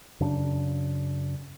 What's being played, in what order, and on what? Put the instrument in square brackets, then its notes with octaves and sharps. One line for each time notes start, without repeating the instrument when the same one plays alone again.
[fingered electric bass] F#2 C#3 D4